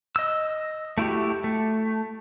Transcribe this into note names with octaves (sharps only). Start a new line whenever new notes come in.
D#5 E6
A3 E4 F#4 G4
A3